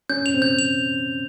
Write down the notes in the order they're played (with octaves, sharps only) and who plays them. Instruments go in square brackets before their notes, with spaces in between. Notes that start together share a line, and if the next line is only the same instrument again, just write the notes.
[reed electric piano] C#4 [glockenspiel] G6
[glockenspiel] F7
[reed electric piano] C4
[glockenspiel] G6
F7